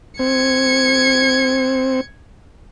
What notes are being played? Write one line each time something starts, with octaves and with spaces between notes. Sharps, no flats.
C4 G#6 C#7